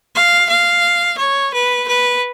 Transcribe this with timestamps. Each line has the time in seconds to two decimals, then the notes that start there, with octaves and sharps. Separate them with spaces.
0.15 F5
0.50 F5
1.18 C#5
1.54 B4
1.88 B4